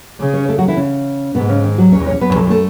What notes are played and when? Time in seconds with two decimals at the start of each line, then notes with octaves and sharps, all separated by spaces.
0.20 C#3
0.34 C#4 C#5
0.49 A3 A4
0.58 F#3 F#4
0.68 E3 E4
0.77 C#3 C#4
1.35 G#2 B2 B3
1.49 C#3 C#4
1.64 D#3 D#4
1.78 F#3 F#4
1.92 E2 C#4 C#5
2.06 C#4 C#5
2.21 F#2 B3 B4
2.35 A3 A4
2.50 A3 A4